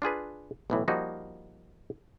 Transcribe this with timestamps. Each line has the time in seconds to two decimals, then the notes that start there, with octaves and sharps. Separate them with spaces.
0.02 D4 F4 G#4 B4
0.70 B1 A2 E3
0.88 F3 G3 A#3 D#4 F#4